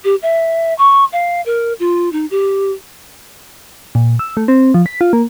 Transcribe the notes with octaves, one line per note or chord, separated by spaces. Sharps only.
G4
E5
C#6
F5
A#4
F4
D#4
G4
A#2
E6
A3
C4
F3
B6
F4
A#3